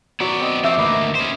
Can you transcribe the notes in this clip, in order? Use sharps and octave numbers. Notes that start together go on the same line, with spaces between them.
F#3 B3 D5 E6
C4 D#5
F3 C4 E5 F#5 C#6 D6 E6
D2 A#3 B4 D#5
C#4 C5